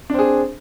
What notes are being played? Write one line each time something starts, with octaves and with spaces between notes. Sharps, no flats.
C4 D4 G#4